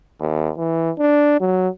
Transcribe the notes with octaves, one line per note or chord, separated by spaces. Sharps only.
D#2
E3
D4
F#3